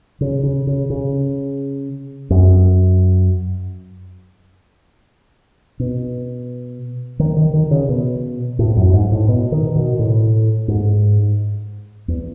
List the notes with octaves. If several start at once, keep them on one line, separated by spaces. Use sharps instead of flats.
C#3
C#3
C#3
C#3
F#2
B2
D#3
D#3
D#3
C#3
B2
A2
F#2
G#2
A2
B2
D#3
B2
A2
G#2
E2